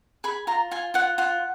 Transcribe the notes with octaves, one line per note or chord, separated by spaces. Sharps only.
G#4 B5
F4 A#5
F4 G#5
F4 F#5
F4 F#5